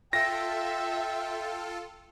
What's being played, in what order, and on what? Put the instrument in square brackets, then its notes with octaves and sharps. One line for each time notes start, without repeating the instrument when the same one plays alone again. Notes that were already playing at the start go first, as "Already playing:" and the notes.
[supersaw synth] F4 A4 [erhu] E5 [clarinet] G5 [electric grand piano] A#6